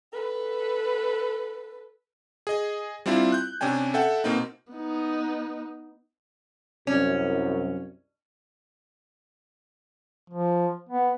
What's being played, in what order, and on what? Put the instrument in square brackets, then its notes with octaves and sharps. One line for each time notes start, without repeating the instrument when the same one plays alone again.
[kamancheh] A4 B4
[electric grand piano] G#4 D#5
G3 C4 D4 E4 F4
F#6 G6
C3 C#4 D4 G5 G#5
A4 E5 F#5 G5
B2 A#3 C4 D#4
[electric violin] B3 D#4
[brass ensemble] C2 F#2 [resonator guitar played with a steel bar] C#4
[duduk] F3
B3